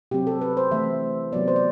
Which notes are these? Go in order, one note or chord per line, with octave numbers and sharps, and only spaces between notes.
C3 F#3 C4 G4
A4
B4
C5
E3 A3 C4 E5
C3 F#3 B3 D5
C5
D5